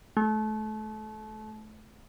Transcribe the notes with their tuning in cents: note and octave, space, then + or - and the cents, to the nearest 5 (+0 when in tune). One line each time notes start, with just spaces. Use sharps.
A3 -30